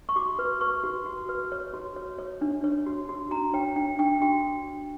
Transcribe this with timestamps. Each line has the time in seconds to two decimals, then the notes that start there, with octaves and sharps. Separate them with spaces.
0.09 C#6
0.16 F#4 D6
0.39 B4
0.61 B4 C#6
0.83 F#4
1.06 F#4
1.29 B4
1.52 C#5
1.74 F#4
1.96 C#5
2.19 C#5
2.41 D4
2.64 C#5
2.86 F#4
3.09 F#4
3.31 D4 A#5
3.54 C#5 G5
3.76 D4 G5
3.99 D4 G5
4.22 F#4 G5